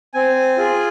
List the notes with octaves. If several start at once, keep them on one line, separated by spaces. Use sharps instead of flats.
C4 G#5
F4 G#4